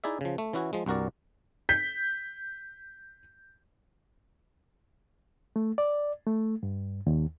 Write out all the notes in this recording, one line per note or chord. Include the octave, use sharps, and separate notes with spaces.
D#4 E4 G#4 D5 E5
C#3 F3
A3
E3 C#4 E4 F#4
F3 G#3
C2 G2 F#4 A#4 D5
G6 B6
A3
D5
A3
G2
D#2